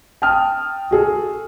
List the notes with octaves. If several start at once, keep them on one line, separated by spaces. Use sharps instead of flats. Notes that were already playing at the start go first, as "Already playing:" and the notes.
G5 A5 D#6 F6
F#4 G#4 A4